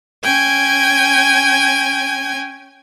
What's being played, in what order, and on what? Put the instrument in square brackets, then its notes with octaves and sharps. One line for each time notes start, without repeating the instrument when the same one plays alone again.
[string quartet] C#4 G5 G#5 G#6